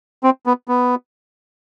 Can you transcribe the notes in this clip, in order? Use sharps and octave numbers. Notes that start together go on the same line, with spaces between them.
C4
B3
B3